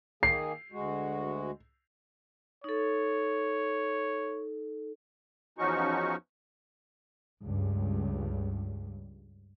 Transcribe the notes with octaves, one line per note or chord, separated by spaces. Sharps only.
D#3 A#3 G#4 C7
D2 G#3 F#4
D#4 A4 C#5
E2 F3 C#4 D#4 F#4 C#6
C#2 G2